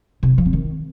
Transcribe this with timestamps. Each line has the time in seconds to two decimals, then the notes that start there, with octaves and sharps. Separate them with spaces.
0.23 C3
0.30 F#3
0.38 F3
0.45 C4
0.53 D#3